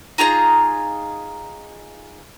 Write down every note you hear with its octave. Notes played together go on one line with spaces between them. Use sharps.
D#4 F4 G#4 A#5